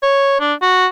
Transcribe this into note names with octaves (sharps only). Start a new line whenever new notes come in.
C#5
D4
F#4